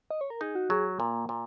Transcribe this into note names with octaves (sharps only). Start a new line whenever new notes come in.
D#5
C#5
A#4
D#4 G#4
F#4
F#3 G#4
A#2 A#3
A#2